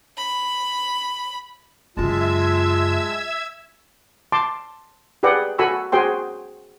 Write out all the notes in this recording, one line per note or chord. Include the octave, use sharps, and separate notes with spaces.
B5
F#2 C#3 G#3 F4 E5 A5 E6 G#6
A5 C6 D6
G4 G#4 B4 D5 F#5 G5
F#4 A4 G#5 B5 C#6 E6
F#4 G#4 C5 G5 C6